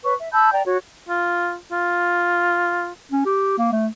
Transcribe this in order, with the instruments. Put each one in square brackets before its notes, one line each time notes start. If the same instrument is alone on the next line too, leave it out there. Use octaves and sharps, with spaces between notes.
[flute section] B4 C#5 C#6
E5
A5 B5 E6 G6
D5 G5 A#5
F#4 C#5
[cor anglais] F4
F4
[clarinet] C#4
G4
A#3
A3